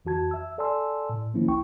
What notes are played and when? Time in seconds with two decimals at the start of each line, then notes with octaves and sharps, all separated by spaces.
0.05 F2 E3 F#4 A5 G#6
0.31 E5 E6
0.58 A4 D5 G#5 A5 C6 E6
1.10 A2
1.34 D#3 F3 A#3 C#4 E4
1.48 C2 E4 G5 C#6